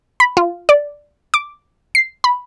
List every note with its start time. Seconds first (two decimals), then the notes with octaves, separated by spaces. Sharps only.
0.20 B5
0.37 F4
0.69 D5
1.34 D6
1.95 C7
2.24 B5